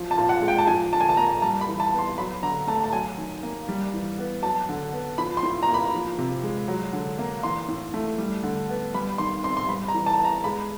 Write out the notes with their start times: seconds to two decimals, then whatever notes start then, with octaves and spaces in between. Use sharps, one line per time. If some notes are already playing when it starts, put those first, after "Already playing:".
Already playing: F3
0.11 A5
0.17 A#2
0.29 F#5
0.42 G#3
0.48 G5
0.58 A5
0.67 F3 G#5
0.93 D3 A5
1.01 G#5
1.09 A5
1.17 A#3 A#5
1.42 G3 A5
1.61 B5
1.68 E3
1.80 A5
1.92 B3
1.99 C6
2.18 F#3 B5
2.43 D3 A#5
2.67 A3 A5
2.84 A5
2.92 F#3 G#5
3.18 D#3
3.43 A#3
3.69 G3
3.94 E3
4.19 B3
4.42 F#3 A5
4.69 D3
4.93 B3
5.18 F3 B5
5.37 C6
5.43 A2
5.63 A#5
5.68 A#3
5.74 B5
5.94 F3
6.19 C3
6.43 G#3
6.68 F#3
6.93 D3
7.18 A#3
7.43 E3 C6
7.68 A2
7.94 A3
8.18 G3
8.43 D3
8.69 B3
8.94 G3 B5
9.18 D#3 C6
9.43 C4 C6
9.57 C6
9.68 G3 B5
9.88 A#5
9.94 E3
10.06 A5
10.20 B3
10.25 A#5
10.44 G#3 B5